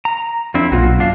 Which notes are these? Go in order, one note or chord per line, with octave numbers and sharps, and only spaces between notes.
A#5
F2 C4 D4 E4
B1 A#2 F4 F#4
F#2 D4 F5